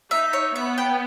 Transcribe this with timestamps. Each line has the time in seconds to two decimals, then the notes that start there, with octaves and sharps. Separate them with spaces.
0.11 D#4 E5
0.33 C#5
0.55 B3 E5
0.78 G5